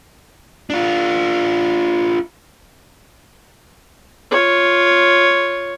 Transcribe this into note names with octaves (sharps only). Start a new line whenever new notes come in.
D4 F4
F4 C#5